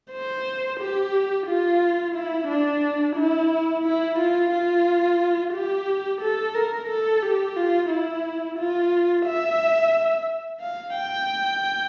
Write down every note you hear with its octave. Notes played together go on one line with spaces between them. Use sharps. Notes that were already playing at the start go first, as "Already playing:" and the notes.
C5
G4
F4
E4
D4
E4
E4
F4
F4
G4
A4
A#4
A4
G4
F4
E4
F4
E5
F5
G5